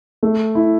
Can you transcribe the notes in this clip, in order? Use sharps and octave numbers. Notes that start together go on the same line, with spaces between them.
A3
E4